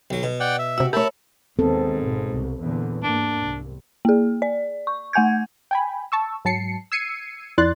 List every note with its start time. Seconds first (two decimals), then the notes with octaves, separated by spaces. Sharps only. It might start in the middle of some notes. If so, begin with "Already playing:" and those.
0.11 B1 F#3
0.23 B2
0.40 D5 F#5 G5
0.59 E5
0.78 C3 F#4 G4 E6
0.93 A3 G4 A#4 C#5 E5 A5 B5
1.59 D#2 G#2 D#3 B3 C4 A4
1.98 G#1 B2
2.31 C2
2.62 E2 A#2 D3
3.04 G#2 A#3 D4
3.41 C2
4.05 A#3 G#4
4.42 D5
4.87 C#6
5.13 A3 F#5 G#5 G6 G#6
5.71 G5 G#5 B5
6.12 A5 C#6 E6
6.45 G#2 F#3 A5 C7 C#7
6.92 E6 G#6 C7 C#7 D#7
7.58 F2 E4 D5 C6 F#6 A6